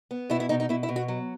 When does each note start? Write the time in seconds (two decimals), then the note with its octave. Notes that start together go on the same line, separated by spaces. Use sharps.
0.11 B3
0.30 B2 E4
0.40 E4
0.49 B2 D#4
0.60 D#4
0.69 B2 E4
0.83 E4
0.89 B2
0.96 F#4
1.08 F#3